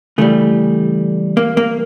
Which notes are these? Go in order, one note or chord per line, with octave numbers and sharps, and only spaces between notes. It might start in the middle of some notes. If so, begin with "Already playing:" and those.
C#3 E3 G3 A3
A#3
A#3